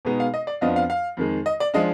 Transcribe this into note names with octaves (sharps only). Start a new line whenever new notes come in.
B2 G#3 B3 D#4
F5
D#5
D5
F2 F3 B3 D4 F4 D#5
F5
F5
F2 D#3 G#3
D#5
D5
F3 G#3 D4 D#5